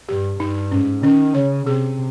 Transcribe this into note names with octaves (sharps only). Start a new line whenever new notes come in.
G2 G4
G2 D#4
G#2 C#4
D#3 C#4
C#3 C#5
C3 G#4